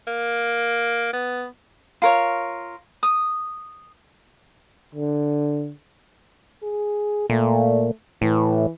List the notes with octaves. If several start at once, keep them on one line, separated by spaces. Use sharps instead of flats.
A#3
B3
F4 A#4 C#5
D#6
D3
G#4
A#2 A3
A2 E3